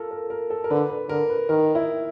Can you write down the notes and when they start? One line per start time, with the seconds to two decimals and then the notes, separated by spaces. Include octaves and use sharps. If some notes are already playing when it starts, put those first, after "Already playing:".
Already playing: F4 A4 A#4
0.11 A#4
0.30 A#4
0.50 A4
0.64 A#4
0.70 D3 B4
0.89 B4
1.09 D3 A#4
1.30 B4
1.49 D#3 A#4
1.75 E4